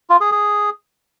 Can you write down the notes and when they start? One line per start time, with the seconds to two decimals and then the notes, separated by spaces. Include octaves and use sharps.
0.10 F4
0.21 G#4
0.32 G#4